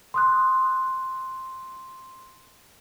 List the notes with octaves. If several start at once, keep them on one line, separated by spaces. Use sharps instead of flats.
C6 D#6 F#6